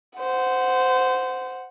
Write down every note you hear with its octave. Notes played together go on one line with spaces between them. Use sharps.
C5 F#5